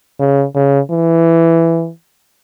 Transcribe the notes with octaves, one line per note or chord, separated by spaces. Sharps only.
C#3
C#3
E3